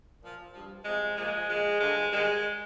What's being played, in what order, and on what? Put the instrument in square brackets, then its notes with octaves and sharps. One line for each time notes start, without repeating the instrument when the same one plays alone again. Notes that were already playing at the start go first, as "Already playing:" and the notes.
[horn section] A#2 F3
G2 F3
C3 F3 G#3
A#2 F3 G#3
A#2 F3 G#3
G2 D3 F3 G#3
G#2 D#3 G3 G#3